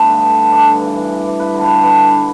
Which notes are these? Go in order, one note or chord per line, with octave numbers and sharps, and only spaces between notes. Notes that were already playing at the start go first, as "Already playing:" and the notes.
Already playing: G2 A3 B3
D3
D3
D3
G2 D4
G2
E3
E3
E3
E3
G2 B4
D3
B4
D3
D3 B4
G2